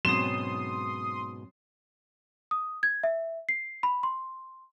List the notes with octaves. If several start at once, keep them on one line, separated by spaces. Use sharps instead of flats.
G#2 B2 F#3 C4 C#4 C6 D#6 E7
D#6
G#6
E5
C7
B5
C6